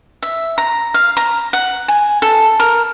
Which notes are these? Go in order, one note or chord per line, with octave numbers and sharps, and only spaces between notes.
E5
A#5
F5
A#5
F#5
G#5
A4
A#4